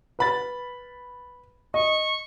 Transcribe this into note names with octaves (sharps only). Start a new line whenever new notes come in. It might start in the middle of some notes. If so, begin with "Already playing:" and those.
B4 B5 A6
D#5 C#6